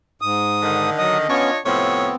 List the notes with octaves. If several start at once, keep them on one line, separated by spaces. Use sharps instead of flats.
G#2 D#6
D3 D#3
F#3 D#5 D#6
B3 C#4 D4 F4 C#5
A2 C3 F3 B3 C4 C#5